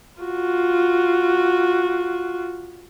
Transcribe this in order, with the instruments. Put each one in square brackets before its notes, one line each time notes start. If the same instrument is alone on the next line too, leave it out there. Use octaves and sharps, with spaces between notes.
[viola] F4 F#4